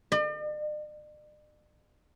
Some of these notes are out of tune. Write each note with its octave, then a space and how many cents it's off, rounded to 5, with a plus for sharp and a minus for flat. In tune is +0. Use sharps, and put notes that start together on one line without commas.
D5 +45